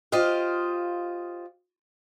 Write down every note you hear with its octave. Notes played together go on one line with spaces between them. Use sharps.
F4 G4 C5 D#5 F5